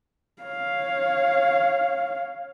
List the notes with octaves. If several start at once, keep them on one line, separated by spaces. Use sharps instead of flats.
C#5 F5